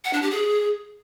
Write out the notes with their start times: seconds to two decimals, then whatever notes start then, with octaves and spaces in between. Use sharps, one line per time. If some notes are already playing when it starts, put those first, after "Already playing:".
0.04 F#5
0.13 D4
0.22 G4
0.31 G#4